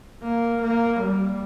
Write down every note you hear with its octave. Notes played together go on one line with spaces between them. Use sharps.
A#3
A#3
G3